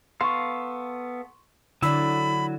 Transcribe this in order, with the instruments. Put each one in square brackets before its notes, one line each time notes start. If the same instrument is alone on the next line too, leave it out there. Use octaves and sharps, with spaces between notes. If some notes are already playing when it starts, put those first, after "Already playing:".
[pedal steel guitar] B3 A4 F5 [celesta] C6 C#6
[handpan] D3 D5 [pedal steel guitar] F#3 E4 [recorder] B5 [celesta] E6